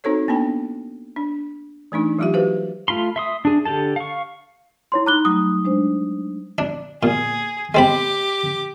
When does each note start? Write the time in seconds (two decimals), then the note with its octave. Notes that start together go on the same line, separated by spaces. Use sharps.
0.04 C4 D#4 F#4 A4 C5 C#5
0.28 A#3 B3 D4 G5 G#5
1.16 D4
1.92 E3 A3 D4 D#4
2.18 E3 F#3 G3 F4 G4 E5
2.34 F#4 G4 B4 C5 F5
2.88 A3 F4 B5 C6
3.16 E5 C6 D#6
3.45 D4 G#4
3.65 D3 G4 A4 A5
3.96 F5 C#6
4.92 E4 C#5 C6
5.06 D#4 A#5 B5 D6 F#6 G7
5.25 F#3 G3 A3 D#6
5.65 G#3 D4 C5
6.58 D4
7.03 A#2 G#4
7.75 G#3 C4 G4 B5 D6